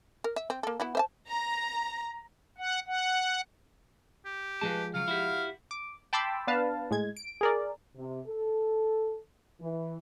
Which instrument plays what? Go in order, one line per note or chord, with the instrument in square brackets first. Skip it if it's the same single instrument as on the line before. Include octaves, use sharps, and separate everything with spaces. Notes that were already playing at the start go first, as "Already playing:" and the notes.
[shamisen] A#4
E5
C4
A#3 A4
B3 E4 F#4
C5 E5 A5
[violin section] A#5
[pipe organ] F#5
F#5
[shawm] G4
[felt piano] F3 G#3 [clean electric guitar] B4 D#5 A5
[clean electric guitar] C#3 F#3 [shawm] F5
[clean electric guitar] E4 F#4 G4
[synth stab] D6
G5 A5 B5 C6 D6 E6
B3 D4 B4 F5 A5
A2 G#3 G#6
D7
G#4 A#4 D5
[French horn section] C3
A4
E3